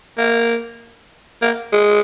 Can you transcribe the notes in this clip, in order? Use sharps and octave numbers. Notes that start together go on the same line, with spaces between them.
A#3
A#3
G#3